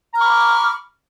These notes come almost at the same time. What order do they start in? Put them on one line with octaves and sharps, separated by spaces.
A#5 F6 C#6 B5 D6